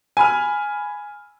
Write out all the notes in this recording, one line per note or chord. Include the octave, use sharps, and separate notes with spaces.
G#5 B5 F6